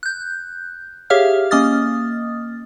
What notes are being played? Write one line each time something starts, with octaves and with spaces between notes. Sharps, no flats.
F#6 G6
G4 G#4 C#5 E5 F5 F6
A#3 C#4 D#5 D#6 F6 A6